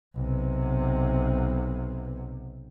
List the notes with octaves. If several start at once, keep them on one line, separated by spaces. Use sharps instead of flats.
B1 C3